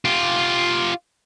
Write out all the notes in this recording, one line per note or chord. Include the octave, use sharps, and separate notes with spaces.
F4 G4